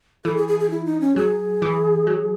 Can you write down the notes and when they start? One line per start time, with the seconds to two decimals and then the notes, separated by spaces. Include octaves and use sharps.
0.25 E3 A4
0.36 G#4
0.48 G#4
0.60 G#4
0.70 E4
0.85 D#4
1.01 C#4
1.16 F#3 G#4
1.62 E3
2.07 F#3